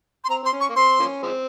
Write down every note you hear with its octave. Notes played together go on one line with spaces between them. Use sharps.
C6
C4 A#5
C4 C6
C#4
C#6
A#3
C4 C6
F3 A#3 C#4
F3 G#3 C4